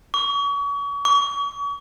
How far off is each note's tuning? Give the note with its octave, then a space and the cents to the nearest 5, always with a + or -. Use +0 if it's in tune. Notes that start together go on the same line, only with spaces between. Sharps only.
C#6 +40
C#6 +45